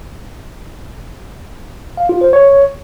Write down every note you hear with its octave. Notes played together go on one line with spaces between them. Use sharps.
F5
F4
C5
C#5